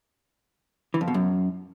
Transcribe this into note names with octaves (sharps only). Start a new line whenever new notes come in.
E3
F2
B2
F#2